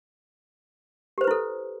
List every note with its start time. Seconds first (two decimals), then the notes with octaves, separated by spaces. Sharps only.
1.18 G4
1.21 C5
1.24 B4
1.27 E4
1.31 A4